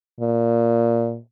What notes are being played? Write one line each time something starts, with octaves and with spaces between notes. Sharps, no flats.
A#2